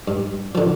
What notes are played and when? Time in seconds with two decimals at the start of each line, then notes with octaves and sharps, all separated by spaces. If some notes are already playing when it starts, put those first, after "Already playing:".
0.08 G2
0.55 D3 F3